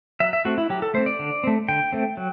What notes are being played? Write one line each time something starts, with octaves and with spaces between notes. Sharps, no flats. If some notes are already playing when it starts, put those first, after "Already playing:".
F#3 E5
E5
A3 C4 F#4
E4
F#3 G4
A4
A3 C4 C5
D5
D3
A3 C4
D3 G5
A3 C4
F#3